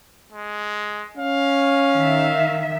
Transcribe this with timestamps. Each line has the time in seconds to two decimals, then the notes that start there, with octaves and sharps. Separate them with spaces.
0.32 G#3
1.17 C#4 F5
1.93 D#3 E5